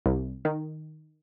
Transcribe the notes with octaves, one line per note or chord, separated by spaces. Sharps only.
C2
D#3